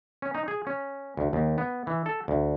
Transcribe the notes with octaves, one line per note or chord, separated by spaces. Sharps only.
C#4
D#4
G#4
C#4
D2
D#2
B3
E3
A4
D2